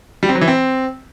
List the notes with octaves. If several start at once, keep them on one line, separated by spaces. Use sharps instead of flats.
G3
C4
F#3
E3
C4